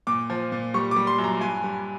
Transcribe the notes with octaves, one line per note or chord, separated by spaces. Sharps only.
A#2 D6
F3
A#2
G3 C#6
D6
G3
C6
F#2
A#5
G2 G#5
G3